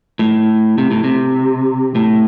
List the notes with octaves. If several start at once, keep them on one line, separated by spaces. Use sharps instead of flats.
A2
C3
A2
C3
A2